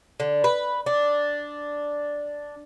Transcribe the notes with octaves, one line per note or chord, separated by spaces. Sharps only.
D3
B4
D4